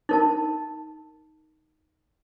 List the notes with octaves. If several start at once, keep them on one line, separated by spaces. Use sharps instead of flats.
D#4 A#4 A5